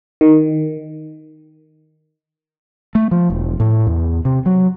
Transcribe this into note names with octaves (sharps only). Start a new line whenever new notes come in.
D#3
A3
F3
E1
A2
E2
C3
F#3